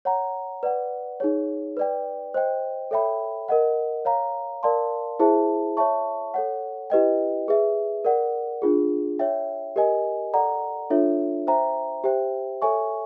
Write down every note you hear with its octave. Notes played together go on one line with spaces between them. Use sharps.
C#5 F#5 A#5
B4 D5 F#5
D#4 G#4 C#5
B4 D5 G5
C5 D#5 G5
A4 C#5 E5 G5 B5
A#4 D#5 F#5
C#5 F5 A#5
A#4 D5 F5 A5 C6
E4 G#4 C5 E5 A5
C#5 E5 A5 C#6
A4 C#5 F#5
E4 G4 B4 D#5 G5
G#4 B4 E5
A#4 D5 F#5
D4 F4 G#4
C#5 E5 G5
G4 A#4 D#5 G#5
A4 D5 F#5 A#5
D4 F4 A4 C#5 E5
C5 E5 G5 A#5
G4 C5 E5 G5
A4 C#5 E5 G#5 C#6